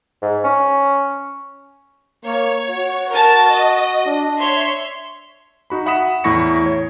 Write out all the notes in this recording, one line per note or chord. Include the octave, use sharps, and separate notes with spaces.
G#2
C#4
A#3 C#5
F#4
A#4 A5
D#5
D4
C#5 E5 C6
D#4 F#4 B5
E5 F#5 B5 D#6 B6 E7
E2 A2 E4 C#6 A#6 C#7
C#5